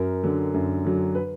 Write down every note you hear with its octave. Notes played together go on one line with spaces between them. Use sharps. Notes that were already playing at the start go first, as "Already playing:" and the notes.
Already playing: F#2 A#4
D3 F#3
F#2
D3 F#3
B4